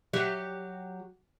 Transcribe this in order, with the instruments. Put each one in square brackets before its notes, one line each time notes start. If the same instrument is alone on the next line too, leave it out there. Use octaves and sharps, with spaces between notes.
[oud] F#3 G4 E5